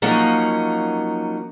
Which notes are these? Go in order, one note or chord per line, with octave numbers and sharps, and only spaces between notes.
F3 F#3 A#3 C#4 D#4